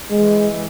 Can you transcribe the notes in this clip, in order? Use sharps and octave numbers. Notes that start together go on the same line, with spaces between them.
E3 G#3